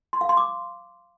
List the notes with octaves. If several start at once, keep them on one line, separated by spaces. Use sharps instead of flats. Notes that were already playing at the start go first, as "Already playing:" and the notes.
C6
F5
C6
D6